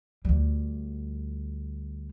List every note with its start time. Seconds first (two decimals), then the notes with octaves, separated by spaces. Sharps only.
0.25 D2 G3